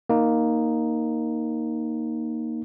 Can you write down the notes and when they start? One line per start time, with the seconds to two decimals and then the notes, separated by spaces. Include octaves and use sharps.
0.09 A#3 D#4